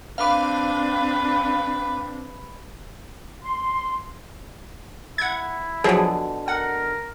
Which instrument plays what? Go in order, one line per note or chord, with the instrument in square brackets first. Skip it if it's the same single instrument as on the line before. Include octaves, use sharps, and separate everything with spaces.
[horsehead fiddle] C4 D4 [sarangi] B4 [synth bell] F5 D6
[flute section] C6
[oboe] E4 [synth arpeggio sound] F#5 G#6
[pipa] B2 D3 [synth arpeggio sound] F3 F#3 G#4
[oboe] A#4 [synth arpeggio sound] F#5